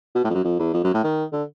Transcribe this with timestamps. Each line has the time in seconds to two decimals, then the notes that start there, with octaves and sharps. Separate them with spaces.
0.15 B2
0.24 A2
0.30 F2
0.34 F#2
0.44 F2
0.59 E2
0.74 F2
0.84 F#2
0.94 A2
1.03 D#3
1.33 D3